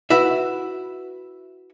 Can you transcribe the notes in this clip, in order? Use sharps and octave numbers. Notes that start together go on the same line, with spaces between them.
E4 F#4 B4 E5